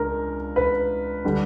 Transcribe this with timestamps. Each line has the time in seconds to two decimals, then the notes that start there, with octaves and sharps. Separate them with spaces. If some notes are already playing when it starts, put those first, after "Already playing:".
Already playing: C#2 D4 A#4
0.56 B4
1.25 D3 G3